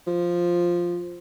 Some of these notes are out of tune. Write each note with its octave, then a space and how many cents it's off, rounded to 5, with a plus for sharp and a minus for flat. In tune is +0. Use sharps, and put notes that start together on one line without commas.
F3 +0